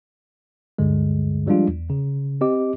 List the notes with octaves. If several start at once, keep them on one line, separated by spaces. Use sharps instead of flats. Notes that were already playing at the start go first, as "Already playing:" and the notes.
D2 G2 D3 G#3
F3 G3 G#3 D4 F4
E2
C#3
C4 G4 D#5 D6